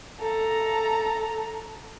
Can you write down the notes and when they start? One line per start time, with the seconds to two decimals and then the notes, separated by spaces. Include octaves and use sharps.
0.20 A4 A#5